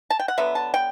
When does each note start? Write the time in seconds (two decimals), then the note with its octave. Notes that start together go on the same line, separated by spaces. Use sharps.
0.10 A5
0.20 G5
0.28 F#5
0.37 D3 F#3 B3 E5
0.55 A5
0.74 G5